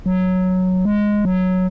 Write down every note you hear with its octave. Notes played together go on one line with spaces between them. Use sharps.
F#3
G#3
F#3